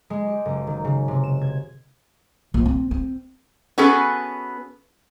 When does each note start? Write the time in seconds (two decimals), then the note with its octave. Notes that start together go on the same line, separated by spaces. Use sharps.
0.10 G#3
0.27 G4
0.45 F#1
0.67 D#3
0.85 C#3
1.08 C3
1.24 E7
1.42 G#6
2.54 A#1
2.66 C4
2.91 C4
3.78 B3 C#4 F#4 G#4 A4 B4